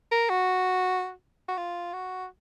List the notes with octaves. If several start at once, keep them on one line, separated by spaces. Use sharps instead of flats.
A#4
F#4
F#4
F4
F#4